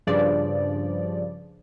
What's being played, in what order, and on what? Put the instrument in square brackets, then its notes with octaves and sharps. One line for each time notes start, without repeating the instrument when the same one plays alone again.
[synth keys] G2 C#3 F3 D5